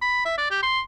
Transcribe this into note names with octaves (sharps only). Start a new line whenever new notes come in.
B5
E5
D5
G4
C6